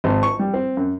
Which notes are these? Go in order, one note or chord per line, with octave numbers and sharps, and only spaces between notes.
G#1
C#6
G3
C4
F#2